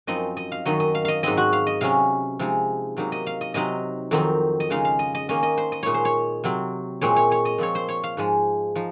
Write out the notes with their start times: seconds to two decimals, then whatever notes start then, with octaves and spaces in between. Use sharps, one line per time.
0.07 F#2 F3 C4 D#4 D#5
0.37 D#5
0.52 F5
0.66 F#2 D#3 F#3 D#5
0.80 D#5
0.95 F5
1.05 D#5 F5
1.23 G#2 F#3 C4 D#5
1.37 F#4
1.53 F5
1.67 D#5
1.81 C3 F#3 C#4 F5
2.39 C3 F3 G#3 D#4
2.97 C3 F#3 A#3 D#4
3.12 D#5
3.27 F5
3.41 D#5
3.54 C3 F#3 C4 D#4 D#5
4.11 F2 D#3 F#3 C4 D#4
4.60 D#5
4.70 C#3 G#3 D#4 F5
4.85 F5
4.99 D#5
5.15 D#5
5.29 D#3 A#3 C#4 D#5
5.43 D#5
5.58 C5
5.72 D#5
5.83 A#2 G#3 D#4 C#5
5.94 C5
6.05 C#5
6.44 C3 F#3 C4
7.01 A#2 G#3 C4 C#5
7.16 C#5
7.32 C#5
7.45 D#5
7.58 A#2 F3 C4 C#5
7.75 C5
7.89 C#5
8.04 F5
8.17 G#2 F3 G#3
8.76 F3 D#4